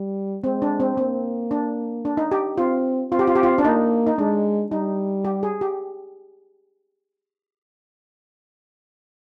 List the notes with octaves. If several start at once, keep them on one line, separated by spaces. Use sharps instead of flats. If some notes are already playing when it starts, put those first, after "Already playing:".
Already playing: G3
G#3 C4
D4
C4
A#3 C4
D4
D4
D#4
G4
C4 F4
C4 F4
G4
F4
G4
F4
D4
A#3 D#4
D#4
G#3 D4
G3 D#4
G4
G#4
G4